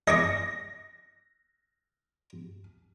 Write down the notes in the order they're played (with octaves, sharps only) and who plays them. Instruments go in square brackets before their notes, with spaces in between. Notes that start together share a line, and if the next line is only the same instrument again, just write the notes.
[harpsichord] D#5 C#6 D6 [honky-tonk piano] A#6